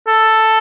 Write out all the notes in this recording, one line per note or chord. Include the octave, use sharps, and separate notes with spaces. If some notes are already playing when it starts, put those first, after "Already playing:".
A4